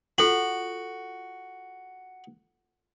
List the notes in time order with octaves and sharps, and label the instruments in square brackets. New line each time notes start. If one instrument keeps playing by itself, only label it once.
[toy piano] F4 A4 F#5 [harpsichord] F#4